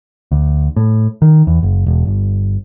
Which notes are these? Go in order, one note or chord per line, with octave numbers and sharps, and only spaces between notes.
D2
A2
D#3
E2
F#1
E1
G1